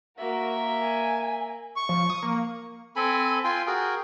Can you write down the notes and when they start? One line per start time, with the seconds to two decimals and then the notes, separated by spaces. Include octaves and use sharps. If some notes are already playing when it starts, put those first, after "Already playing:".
0.18 A#3 F#4 A#4 E5
0.81 G#5
1.76 C#6
1.89 F3
2.10 D#6
2.23 A#3
2.96 C4 A4 G#5 B5
3.44 F4 G5 G#5 C6
3.67 F#4 G#4 A#4 G5